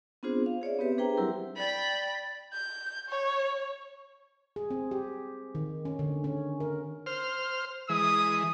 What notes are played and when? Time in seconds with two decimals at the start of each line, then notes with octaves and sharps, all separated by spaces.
0.23 B3 C4 D4 F4 G#4 C5
0.46 F5
0.62 G#4 C#5 D5 E5
0.79 B3 C4 G4 B4 E5
0.98 D4 G#4 B4 C5 G5 A#5
1.17 F#3 G3 C4 E4 G4 A#4
1.57 D5 G5 B5
2.53 G6
3.09 C#5
4.56 G#4
4.70 C4
4.91 G4
5.55 D#3
5.85 C#4
5.99 D3
6.24 C#4
6.60 A#4
7.06 C5 F6
7.89 E3 G#3 D#6